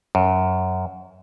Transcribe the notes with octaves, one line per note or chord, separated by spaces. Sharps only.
F#2